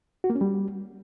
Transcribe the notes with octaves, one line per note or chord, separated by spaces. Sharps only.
F#4
A#3
C#4
G3